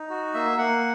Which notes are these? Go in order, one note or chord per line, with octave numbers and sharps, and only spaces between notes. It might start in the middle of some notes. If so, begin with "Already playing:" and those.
Already playing: D#4
F#4
A#3 E5
A#3 F#5